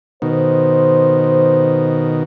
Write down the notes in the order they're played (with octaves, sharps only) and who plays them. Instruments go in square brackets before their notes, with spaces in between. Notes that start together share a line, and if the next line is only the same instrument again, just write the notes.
[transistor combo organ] B2 D#3 [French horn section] C5